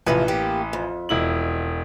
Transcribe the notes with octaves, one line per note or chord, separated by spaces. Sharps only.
A1 E2 C3 F3 B4
A#3 G4
F2
E1 E4 F#7